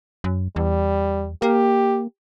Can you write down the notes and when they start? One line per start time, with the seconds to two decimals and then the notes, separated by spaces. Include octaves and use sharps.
0.24 F#2
0.56 E2 G3
1.42 A#3 G4